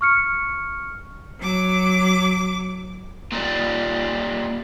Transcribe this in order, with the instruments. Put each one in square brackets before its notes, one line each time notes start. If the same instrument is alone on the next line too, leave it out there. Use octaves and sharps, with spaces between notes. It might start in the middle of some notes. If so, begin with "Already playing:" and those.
[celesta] C#6 F6 C#7
[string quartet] F#3 D6
[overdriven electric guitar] A#2 G3